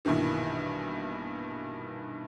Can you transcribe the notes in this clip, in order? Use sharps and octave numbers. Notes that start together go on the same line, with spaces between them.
A#1 G2 B2 D#3 E3